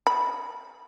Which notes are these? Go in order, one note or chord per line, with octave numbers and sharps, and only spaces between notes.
B5